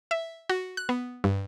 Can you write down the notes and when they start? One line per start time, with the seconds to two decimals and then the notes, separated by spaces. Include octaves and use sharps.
0.11 E5
0.49 F#4
0.77 F#6
0.89 B3
1.24 G2